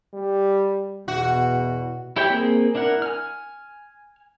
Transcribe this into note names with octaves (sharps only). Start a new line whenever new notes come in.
G3
E2 B2 F#4
E4 G4 C#5 G5 B5
A#3 C4 G#4
D4 E4 A#4 F#5
G#5 F6